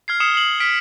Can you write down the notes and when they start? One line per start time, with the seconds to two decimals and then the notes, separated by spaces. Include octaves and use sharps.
0.08 F6 G#6 C7
0.20 D#6 C7 C#7 E7 G7
0.36 C7 F#7
0.60 F6 B6 D7